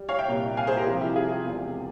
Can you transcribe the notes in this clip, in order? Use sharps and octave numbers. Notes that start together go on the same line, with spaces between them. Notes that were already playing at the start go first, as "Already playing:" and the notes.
Already playing: G3
C#5 F5
E5 G5
C2 A#2 G3
F5 G#5
G#4 C5
G4 A#4
C2 C3 F3 F4
E4 G4
F4 G#4
E1 E2 C3 G3